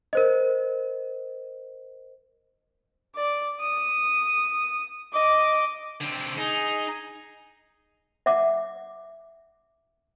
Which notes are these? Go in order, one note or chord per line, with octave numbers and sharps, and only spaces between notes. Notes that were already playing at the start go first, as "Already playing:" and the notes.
A#4 C5 D#5
D5
D#6
D#5 D6
D3 C4
D#4 G#4
E5 F#5 D6